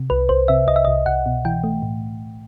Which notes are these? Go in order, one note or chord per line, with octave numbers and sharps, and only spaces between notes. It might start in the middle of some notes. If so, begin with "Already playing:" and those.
Already playing: C3
C2 B4
C2 C5
C3 E5
C2 D#5
E5
C2 D#5
C2 F#5
B2
E3 G5
A3
A2